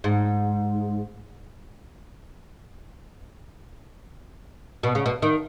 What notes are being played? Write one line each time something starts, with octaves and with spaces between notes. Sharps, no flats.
G#2
B2
C#3
B2
D#3